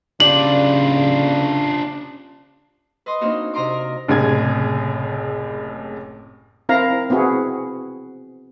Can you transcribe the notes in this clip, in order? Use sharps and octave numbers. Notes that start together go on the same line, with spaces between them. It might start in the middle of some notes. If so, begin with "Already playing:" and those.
C#3 C#4 D4 F4 G4 D5 F#7
B4 D#5 C6 D#6
A#3 C4 D4 D#4 F#4
C3 D#5 A#5 C6 D6
A#4
F#1 A2 C3 G#4 G#6
C4 E4 A#4 F5 A#5
B3 C4 E4 F#4 G#4